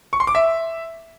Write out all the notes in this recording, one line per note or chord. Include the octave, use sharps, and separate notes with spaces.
C#6
C6
D6
E5